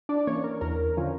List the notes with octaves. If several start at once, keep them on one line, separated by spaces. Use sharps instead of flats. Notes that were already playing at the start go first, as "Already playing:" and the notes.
D4 D5
E3 A#3 C#4 C#5
A#4
E2 A#4
D3 F3 C#4